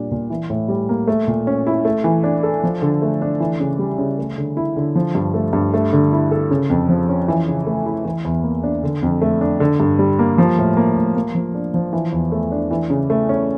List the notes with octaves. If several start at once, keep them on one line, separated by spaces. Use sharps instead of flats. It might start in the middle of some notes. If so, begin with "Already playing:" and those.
Already playing: A#2 G3 D4
A#2
E3
A2
G3
A#3
A3
A#2
C#4
E4
A3
E3
D4
A4
F3
D3
A3
D4
E3
C#3
G3
C#3
A3
D3
E4
D3
F3
G2
A3
G2
A3
D3
E4
A4
C#3
F2
F3
C#4
E3
C#3
A3
E4
E3
E2
A#3
D4
D3
F2
A3
D4
D3
G2
G3
A#3
F3
A2
A#3
A2
A#3
F3
D4
F3
E3
E2
A3
D4
E3
C#3
A3
C#4